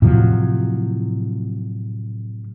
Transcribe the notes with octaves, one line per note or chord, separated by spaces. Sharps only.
A2 C3 F3 F#3